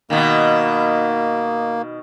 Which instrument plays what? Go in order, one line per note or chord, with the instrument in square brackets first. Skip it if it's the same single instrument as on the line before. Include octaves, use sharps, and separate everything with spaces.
[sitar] B2 D#3 [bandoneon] A#3